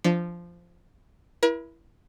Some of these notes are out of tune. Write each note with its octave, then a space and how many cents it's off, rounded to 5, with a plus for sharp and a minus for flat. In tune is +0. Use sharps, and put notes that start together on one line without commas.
F3 -10 D4 +0
E4 +10 A#4 +45